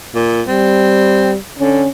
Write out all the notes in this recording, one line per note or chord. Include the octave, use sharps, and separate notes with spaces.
A#2
G3 C4
D3 C#4